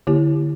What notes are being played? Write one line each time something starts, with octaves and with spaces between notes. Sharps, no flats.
D3 A#3 E4 G4